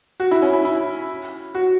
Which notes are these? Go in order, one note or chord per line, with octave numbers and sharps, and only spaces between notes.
F#4
E4
C#4
E4
E4
F#4